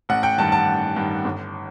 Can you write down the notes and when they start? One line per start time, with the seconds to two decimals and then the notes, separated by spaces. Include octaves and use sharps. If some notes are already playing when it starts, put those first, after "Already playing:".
0.09 A1 F#5
0.23 G5
0.38 G2 D#3 A5
0.52 A5
0.67 A1
0.96 G2 D#3
1.24 G1